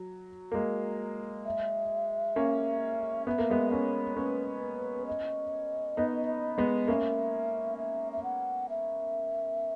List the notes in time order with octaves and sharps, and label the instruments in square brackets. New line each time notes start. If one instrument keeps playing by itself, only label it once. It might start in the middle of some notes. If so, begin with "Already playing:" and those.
Already playing: [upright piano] F#3
A#3
G#3
[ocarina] E5
[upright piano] A#3 C#4
[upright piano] B3 [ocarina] E5
[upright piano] A#3
G#3 B3
[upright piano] A#3 C#4 [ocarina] C#5
[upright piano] A#3 C#4 [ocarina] B4
[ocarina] D#5
[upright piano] B3 D#4
G#3 B3
[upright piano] A#3 C#4 [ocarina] E5
[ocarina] E5
E5
F#5
E5